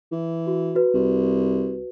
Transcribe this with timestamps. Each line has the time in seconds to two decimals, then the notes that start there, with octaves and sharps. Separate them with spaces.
0.12 E3
0.47 F#4
0.75 F#4 B4
0.94 C2